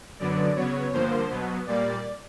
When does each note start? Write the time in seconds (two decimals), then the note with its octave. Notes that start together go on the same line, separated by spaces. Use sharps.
0.19 F#2 D3 F#3 B3 D5
0.56 C#3 F#3 B3 C#5
0.93 G2 D3 F3 A#3 C5
1.30 B2 F#3 B3
1.67 A#2 G3 A#3 D5